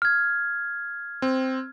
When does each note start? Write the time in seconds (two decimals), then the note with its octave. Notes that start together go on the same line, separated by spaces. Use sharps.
0.02 F6 G#6
1.22 C4